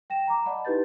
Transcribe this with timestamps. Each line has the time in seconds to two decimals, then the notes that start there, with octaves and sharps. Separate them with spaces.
0.10 G5 A#6 E7
0.27 A#5 D6
0.45 D5 D#5 F#5 A5 B5
0.65 D#4 E4 G4 B4 G6 A6